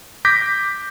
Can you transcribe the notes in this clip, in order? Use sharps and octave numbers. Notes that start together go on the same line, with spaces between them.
D6 G6 A#6 B6